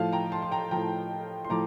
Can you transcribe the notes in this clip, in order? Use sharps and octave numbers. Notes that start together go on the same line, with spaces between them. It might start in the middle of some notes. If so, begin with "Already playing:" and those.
Already playing: A2 F3 F5 A5
G5 A#5
A5 C6
C6
G5 A#5
A2 F3 G5 A#5
C6
A2 F3 A#5 D6